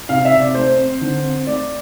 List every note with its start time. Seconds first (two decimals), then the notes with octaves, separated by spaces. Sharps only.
0.09 C3 F5
0.25 E5
0.32 C3
0.40 D5
0.55 A3 C5
0.78 C4
1.01 D3
1.24 C4
1.47 A3 D5